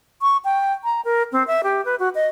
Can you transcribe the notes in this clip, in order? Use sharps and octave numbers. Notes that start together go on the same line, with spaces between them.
C#6
G5
A#5
A#4
C4
E5
G4
B4
F#4
D#5